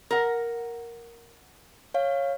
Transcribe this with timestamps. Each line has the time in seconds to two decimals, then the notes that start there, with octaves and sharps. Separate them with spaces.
0.11 A#4 F#5
1.94 C#5 F5